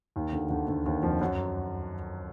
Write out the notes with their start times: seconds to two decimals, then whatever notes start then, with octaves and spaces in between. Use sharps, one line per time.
0.16 D#2 D#3
0.33 D2 D3
0.50 D2 D3
0.68 D2 D3
0.86 D#2 D#3
1.03 F2 F3
1.21 F#2 F#3